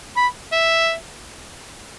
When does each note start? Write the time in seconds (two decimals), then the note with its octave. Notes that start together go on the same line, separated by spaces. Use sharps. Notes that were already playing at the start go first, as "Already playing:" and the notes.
0.16 B5
0.52 E5